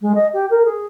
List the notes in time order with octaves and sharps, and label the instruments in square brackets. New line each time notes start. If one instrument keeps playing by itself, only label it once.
[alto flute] G#3
D#5
G4
A#4
G#4